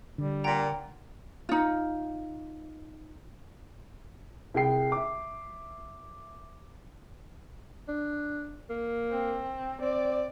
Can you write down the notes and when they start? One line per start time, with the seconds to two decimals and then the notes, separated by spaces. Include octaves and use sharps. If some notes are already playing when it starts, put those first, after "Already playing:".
0.18 D3 G3
0.44 A#2 F#5 G5 A#5
1.49 D#4 F4
4.54 C2 G#4 G5 C7
4.92 E5 D6
7.88 D4
8.70 A#3
9.11 C4
9.82 C4 D5